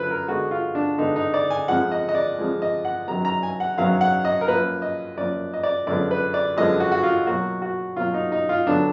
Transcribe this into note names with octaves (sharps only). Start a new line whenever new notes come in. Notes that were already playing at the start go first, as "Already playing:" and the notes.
Already playing: F#2 D3 F3 B4
A#4
D3 G#3 B3 F#4
F4
D4
D3 G#3 B3 D#4
D#4
D5
G#5
F2 F3 G#3 F#5
D#5
D#5
D5
F2 F3 G#3
D#5
F#5
F#2 D#3 F#3 B3 A#5
A#5
G#5
F#5
F#2 D#3 F#3 B3 F5
F#5
D#5
A#4
F#2 F3 A#3 B4
D#5
F#2 F3 A#3 D5
D#5
D5
F#2 D3 F3 G#3 B3 D5
B4
D5
F#2 D3 F3 G#3 B3 D#5
F#4
F#4
F4
B2 F#3 A#3 F#4
F#4
B2 F#3 A#3 F4
D#4
D#4
F4
D3 F#3 B3 D4